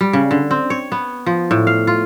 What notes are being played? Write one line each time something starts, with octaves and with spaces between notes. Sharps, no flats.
G3
C#3
D3
C4
C#5
B3
F3
A2
F5
F4